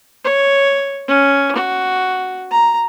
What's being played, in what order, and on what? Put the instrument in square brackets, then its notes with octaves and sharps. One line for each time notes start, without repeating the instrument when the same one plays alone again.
[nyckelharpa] C#5
C#4
F#4
A#5